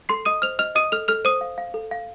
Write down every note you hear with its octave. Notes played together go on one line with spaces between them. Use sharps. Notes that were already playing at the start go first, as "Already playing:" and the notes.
A4 C6 C7
D#5 D#6 D#7
C5 F6 F7
D#5 F6 F7
D#5 D#6 D#7
A4 F6 F7
A4 F6 F7
C5 D#6 D#7
F5
F5
A4
F5